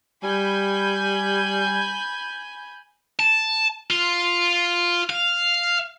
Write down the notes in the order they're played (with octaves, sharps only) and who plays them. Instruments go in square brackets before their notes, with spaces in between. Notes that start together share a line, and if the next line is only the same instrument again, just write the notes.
[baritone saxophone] G3 [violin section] G#5 B5 G6
[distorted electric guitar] A5
F4
F5